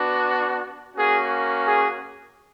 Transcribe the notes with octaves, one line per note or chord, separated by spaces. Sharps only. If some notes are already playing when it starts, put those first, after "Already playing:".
Already playing: B3 D4 F#4
A#3 C#4 F#4 G#4
G#4